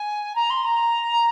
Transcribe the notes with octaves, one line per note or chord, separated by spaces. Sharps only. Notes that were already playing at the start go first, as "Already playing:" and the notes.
Already playing: G#5
A#5
C6
A#5